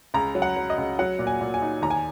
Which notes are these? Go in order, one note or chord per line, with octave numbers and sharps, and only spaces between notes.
C#2 A#5
F#3
F#5
F#3
D#5
C#2
F#3 F#5
A#2
G#5
A#2
G#5
D#4
D#2 A#5
G#5